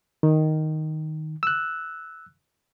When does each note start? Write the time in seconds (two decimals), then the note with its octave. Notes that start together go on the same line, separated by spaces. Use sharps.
0.23 D#3
1.43 E6 F#6